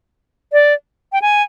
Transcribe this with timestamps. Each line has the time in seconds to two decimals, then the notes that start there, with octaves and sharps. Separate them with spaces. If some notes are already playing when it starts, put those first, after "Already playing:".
0.53 D5
1.13 G5
1.22 G#5